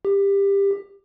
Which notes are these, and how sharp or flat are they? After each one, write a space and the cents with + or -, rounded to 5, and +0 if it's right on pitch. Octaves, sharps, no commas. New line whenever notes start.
G4 +20